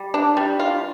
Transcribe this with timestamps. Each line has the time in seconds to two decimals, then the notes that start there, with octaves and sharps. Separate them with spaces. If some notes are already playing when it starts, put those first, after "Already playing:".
Already playing: G3
0.14 D4
0.37 G3
0.59 F4